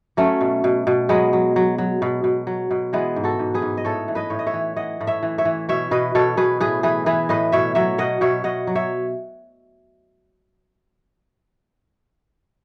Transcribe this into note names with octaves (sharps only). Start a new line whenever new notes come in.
F#3 A3 C#4
B2
B2
B2
F#3 G#3 B3
F#3
F#3
F#3
B2
B2
F#3
B2
E3 G#3 B3
G#2
F#4 A4
G#2
G#4 B4
G#2
D#5
A2 A4 C#5
E3
B4 D#5
A2 C#5
D#5
C#5 E5
E3
E3 D#5 F#5
A2
C#5 E5
E3
C#5 E5
E3
B2 C#5 E5
B2 B4 D#5
B2 A4 C#5
B2 G#4 B4
A2 G#4 B4
E3 G#4 B4
E3 G#4 B4
A2 B4 D#5
B2 C#5 E5
F#3 C#5 E5
B2 D#5 F#5
B2 C#5 E5
B2 D#5 F#5
F#3
C#5 E5